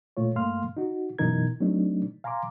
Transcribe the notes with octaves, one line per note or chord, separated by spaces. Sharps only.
A#2 A3 F4 C#5
G2 A3 A#3 F5 C6 F6
D#4 F#4
F#2 B2 E3 D#4 A#4 G#6
F#3 A3 C4 D4 D#4
F5 G#5 A#5 C6 D6